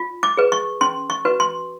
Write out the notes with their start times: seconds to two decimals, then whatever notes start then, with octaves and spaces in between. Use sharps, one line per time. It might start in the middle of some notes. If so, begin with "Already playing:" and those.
Already playing: F4
0.23 D6
0.37 G#4 B4
0.52 C#6
0.81 C#4 C6
1.10 C#6
1.25 F#4 B4
1.40 C6